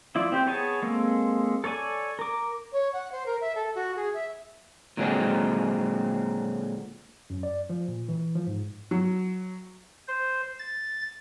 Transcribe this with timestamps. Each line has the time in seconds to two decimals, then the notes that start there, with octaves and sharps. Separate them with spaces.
0.15 F3 E4 F4 D5
0.32 C4 G4 C5 G5
0.47 B3 G#4 C#5 G#5 A5
0.82 G#3 A#3 C4 A4
1.64 A4 C#5 D5 G#5 A5
2.19 A#4 D6
2.72 C#5
2.93 F#5
3.12 C5
3.26 A#4
3.41 E5
3.55 A4
3.75 F#4
3.96 G#4
4.14 E5
4.97 A#2 D3 F#3 G#3 A#3 C4
7.30 F#2
7.43 D5
7.70 F3
7.88 A#2
8.09 E3
8.35 F3
8.47 G#2
8.91 F#3
10.08 C5
10.59 A6